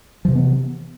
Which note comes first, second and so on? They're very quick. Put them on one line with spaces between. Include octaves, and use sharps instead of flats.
F3 C3 E3 B3